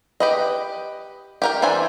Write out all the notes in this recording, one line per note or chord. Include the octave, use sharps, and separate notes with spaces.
G4 B4 D#5
G4 A#4 G5
E3 D4 C5 G#5